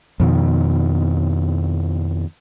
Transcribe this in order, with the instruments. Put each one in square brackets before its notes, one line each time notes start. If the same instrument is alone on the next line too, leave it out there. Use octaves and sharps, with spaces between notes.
[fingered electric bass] F2 B2 D#3